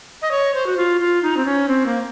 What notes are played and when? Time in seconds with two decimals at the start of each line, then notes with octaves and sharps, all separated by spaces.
0.22 D#5
0.31 C#5
0.55 C5
0.66 F#4
0.77 F4
1.01 F4
1.23 D#4
1.37 C4
1.46 C#4
1.68 C4
1.86 A#3